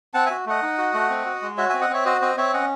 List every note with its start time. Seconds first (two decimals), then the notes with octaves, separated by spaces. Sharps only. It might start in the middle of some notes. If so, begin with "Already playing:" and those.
0.14 C4 F#5 A5
0.26 F#4 E5 G#5
0.46 A3 D#5 F#5
0.62 D#4
0.78 F#4
0.94 A3
1.10 C4
1.26 F#4
1.42 G#3
1.57 F#4 C#5 E5
1.69 C4 E5 G#5
1.81 D#5 F#5
1.90 C4 C#5 E5
2.05 F#4 C5 D#5
2.21 C4 C5 D#5
2.37 C4 C#5 E5
2.53 C#4 D#5 F#5